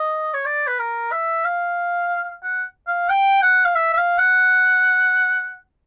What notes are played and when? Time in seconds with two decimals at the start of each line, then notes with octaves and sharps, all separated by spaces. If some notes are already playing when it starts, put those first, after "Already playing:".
Already playing: D#5
0.34 C#5
0.45 D5
0.67 B4
0.79 A#4
1.12 E5
1.45 F5
2.43 F#5
2.88 F5
3.09 G5
3.42 F#5
3.65 F5
3.75 E5
3.93 E5
3.97 F5
4.18 F#5